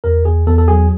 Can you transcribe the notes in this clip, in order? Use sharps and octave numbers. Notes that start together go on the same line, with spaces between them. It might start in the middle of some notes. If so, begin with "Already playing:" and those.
E2 A#4
E2 G#4
E2 A4
A4
F#3 G#4